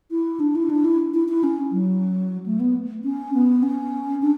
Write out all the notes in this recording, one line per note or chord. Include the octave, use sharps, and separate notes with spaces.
E4
D4
E4
D4
E4
E4
E4
C#4
F#3
A3
B3
C#4
B3
C#4
D4